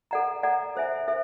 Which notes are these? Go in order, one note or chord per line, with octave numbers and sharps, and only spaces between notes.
A4 D5 F#5 A#5
A4 D5 F#5 A#5
A4 C5 E5 G#5
A4 C5 E5